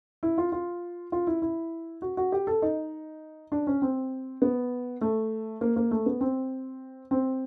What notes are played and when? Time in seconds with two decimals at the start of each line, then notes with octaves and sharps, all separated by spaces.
0.23 E4
0.38 F4
0.52 F4
1.12 F4
1.27 E4
1.42 E4
2.02 F#4
2.17 F#4
2.32 G4
2.47 A4
2.62 D#4
3.52 D4
3.67 C#4
3.82 C4
4.42 B3
5.01 A3
5.61 A#3
5.76 A#3
5.91 A3
6.06 B3
6.21 C4
7.11 C4